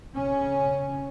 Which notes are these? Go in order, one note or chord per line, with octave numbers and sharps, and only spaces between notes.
C#3 C#4